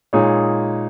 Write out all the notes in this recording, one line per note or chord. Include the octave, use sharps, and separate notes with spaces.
A#2 G#3 D#4 G#4 C#5